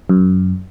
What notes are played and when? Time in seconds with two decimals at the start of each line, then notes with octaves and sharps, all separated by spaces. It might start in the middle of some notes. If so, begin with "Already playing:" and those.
0.09 F#2